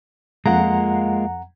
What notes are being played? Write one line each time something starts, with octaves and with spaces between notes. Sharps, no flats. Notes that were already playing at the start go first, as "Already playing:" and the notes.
F2 G#3 A#3 F4 F#5 A#5